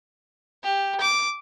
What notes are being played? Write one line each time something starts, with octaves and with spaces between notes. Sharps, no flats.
G4
D6